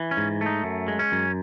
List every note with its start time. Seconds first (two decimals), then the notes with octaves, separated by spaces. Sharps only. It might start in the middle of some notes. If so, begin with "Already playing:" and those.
Already playing: E3
0.11 C#4
0.17 G#2
0.41 A3 D#4
0.64 F#2
0.88 G#3
0.99 C#4
1.12 F#2